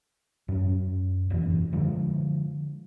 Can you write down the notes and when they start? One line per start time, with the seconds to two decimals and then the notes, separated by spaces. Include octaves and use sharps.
0.48 F#2 C#4
1.30 E1 F#2 E3
1.73 D3 F3 G#3